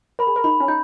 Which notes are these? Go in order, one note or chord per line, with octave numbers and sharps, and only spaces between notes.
A#4 B5
G#4
A#4
D#4 B5
C#4
D#4 G6